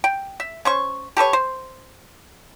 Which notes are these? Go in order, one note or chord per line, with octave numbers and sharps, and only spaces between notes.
G5
E5
C#4 C5 C#6
G4 A4 B4 C#5
C5